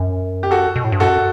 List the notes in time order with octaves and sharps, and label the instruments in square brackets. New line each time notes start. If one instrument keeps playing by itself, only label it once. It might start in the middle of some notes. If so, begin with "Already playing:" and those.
Already playing: [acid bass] F#2
[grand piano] G4
F#4 A4
[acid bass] B2
A2
G2
[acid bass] F#2 [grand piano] F#4 A4